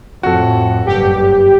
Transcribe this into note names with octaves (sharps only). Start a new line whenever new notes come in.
F2 A2 F#4 A4
F#1 G2 G4